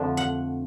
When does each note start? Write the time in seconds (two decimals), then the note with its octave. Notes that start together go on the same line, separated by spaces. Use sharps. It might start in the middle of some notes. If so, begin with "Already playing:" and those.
Already playing: F2 D3 F3 A3 D4
0.17 F#5